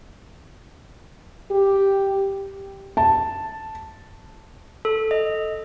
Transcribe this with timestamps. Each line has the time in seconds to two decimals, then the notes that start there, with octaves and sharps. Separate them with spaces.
1.51 G4
2.97 A5
4.85 A4
5.11 D#5